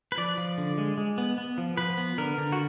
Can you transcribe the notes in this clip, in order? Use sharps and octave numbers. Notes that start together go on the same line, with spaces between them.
B4
F3 D5
F3
D3
G#3
G#3
B3
B3
F3
F3 B4
B3
D3 A#4
D3
F#4